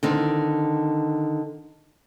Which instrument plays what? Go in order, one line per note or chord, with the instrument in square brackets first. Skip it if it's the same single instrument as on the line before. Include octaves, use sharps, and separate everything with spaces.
[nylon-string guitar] D3 D#3 C4